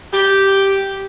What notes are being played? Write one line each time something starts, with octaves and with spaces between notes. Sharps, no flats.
G4